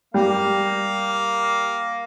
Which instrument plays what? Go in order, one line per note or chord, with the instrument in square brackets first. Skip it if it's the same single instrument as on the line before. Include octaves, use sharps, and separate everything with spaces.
[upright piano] G3 [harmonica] A#3 F5